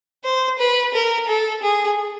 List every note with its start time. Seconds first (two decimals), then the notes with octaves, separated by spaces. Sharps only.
0.24 C5
0.59 B4
0.94 A#4
1.28 A4
1.63 G#4